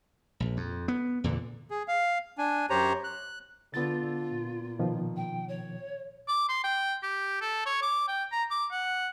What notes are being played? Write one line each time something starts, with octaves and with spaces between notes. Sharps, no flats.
A#1
F2
B3
E2 A#2 D3 E3
G#4
F5
D4 G#5
F#2 G4 C5 C#5 A#5
F#6
D3 B3 F4 A6
A#2
B2 D#3 F3
G5
C#5
D6
C6
G5
G4
A4
C#5
D6
G5
A#5
D6
F#5